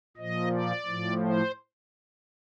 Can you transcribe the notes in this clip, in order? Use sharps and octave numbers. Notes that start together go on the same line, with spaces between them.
A#2 F3 D#5
D5
A2 F3
C5